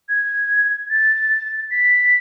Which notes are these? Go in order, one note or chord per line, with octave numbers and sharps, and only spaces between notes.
G#6
A6
B6